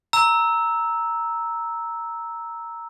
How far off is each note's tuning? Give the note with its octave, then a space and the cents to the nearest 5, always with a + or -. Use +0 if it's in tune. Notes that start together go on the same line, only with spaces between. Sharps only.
A#5 -5 E6 -10